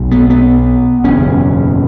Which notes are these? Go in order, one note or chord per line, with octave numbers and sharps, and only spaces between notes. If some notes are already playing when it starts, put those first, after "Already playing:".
Already playing: B1 B2
B3
B3
F#1 E2 B2 C#4